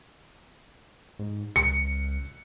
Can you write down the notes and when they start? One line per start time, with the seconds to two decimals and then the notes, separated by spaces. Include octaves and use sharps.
1.19 G#2
1.56 C#2 C#7